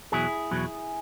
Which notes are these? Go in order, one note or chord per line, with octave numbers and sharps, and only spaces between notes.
E2 B2 F#3 E4 G#4
E2 B2 F#3